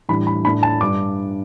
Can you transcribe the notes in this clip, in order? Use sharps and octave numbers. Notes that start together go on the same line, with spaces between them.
A2 E3 G3 D4 B5
B5
A2 A3 D4 B5
A5
G2 G3 D4 D6